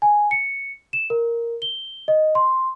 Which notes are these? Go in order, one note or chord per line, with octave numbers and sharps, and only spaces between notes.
G#5
C#7
E7
A#4
G7
D#5
C6